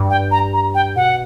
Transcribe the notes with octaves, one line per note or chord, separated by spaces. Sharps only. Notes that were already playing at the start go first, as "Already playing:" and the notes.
Already playing: G2
G5
A#5
A#5
G5
B2 F#5